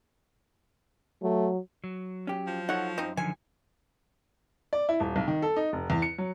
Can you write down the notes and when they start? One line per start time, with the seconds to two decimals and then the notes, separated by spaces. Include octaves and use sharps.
1.22 F#3 A3
1.84 F#3
2.27 C#4 G4
2.47 F3
2.69 D#4 A4 C#5 F#5
2.98 F#2 C4 D#4
3.17 D3 D#3 F3 G#5
4.73 D5
4.89 E4
5.00 D#1
5.16 B1
5.28 D#3
5.42 A4
5.56 D#4
5.73 F1
5.90 E2
6.02 C#7
6.18 F#3